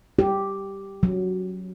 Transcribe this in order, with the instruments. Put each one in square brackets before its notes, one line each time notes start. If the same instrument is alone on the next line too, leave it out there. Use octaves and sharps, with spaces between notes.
[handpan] G4
F#3